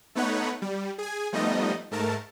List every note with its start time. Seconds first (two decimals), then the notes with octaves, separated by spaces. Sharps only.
0.15 A3 B3 D#4 B4 C#5 F#5
0.62 G3
0.98 G#4 G#5
1.33 F3 G3 A3 B3 D#4 D#5
1.91 G#2 A3 A#4 A5